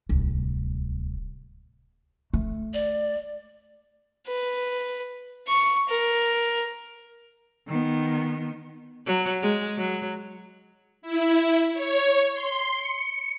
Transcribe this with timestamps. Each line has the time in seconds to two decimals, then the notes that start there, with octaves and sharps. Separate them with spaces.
0.09 D1 C2
2.34 A3
2.74 D5
4.28 B4
5.48 C#6
5.89 A#4
7.67 D#3 B3
9.06 F#3
9.42 G#3
9.77 F#3
11.02 E4
11.74 C#5
12.34 C6
12.75 C#7